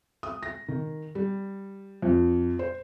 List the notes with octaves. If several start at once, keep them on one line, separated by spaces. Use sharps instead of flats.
D#6
A#6
D#3
G3
F2
C5